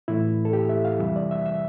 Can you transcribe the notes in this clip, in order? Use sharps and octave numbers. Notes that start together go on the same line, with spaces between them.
A2 E3 A3 E4
A4
G4
E5
F5
F2 C3 E3 G3 E5
D5
E5
E5